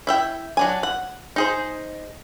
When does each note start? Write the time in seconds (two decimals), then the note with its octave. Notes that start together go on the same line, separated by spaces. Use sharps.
0.07 E4 E5 G5
0.57 F#3 D4 G#5
0.83 F#5
1.36 D#4 G#4 C5